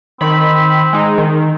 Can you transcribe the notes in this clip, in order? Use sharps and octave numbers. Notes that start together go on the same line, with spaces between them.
D#3 C4 B5
G#3 D#4
D#3